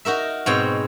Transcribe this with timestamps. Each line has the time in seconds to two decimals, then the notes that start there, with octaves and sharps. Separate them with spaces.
0.05 D#4 F#4 A#4 E5
0.46 G#2 B2 C4 C#5 G5